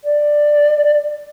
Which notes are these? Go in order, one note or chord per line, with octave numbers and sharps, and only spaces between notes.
D5